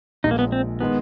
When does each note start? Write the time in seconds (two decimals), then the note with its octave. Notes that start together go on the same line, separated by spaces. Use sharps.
0.24 A#1 A#2 F3 G#3 D#4
0.31 A#3
0.39 B3
0.52 C4
0.81 D#3 G#3 B3